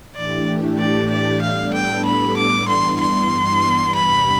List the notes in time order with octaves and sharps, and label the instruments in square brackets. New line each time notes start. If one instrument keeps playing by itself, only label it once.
[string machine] A2 E3 A3 D4 G4 [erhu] D5
[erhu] D5
D5
[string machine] A2 G3 B3 D4 A4 [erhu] F5
[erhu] G5
B5
D6
[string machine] G2 E3 G3 B3 [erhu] C6
[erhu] C6
[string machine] E2 C3 G3 D4 G4 [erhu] B5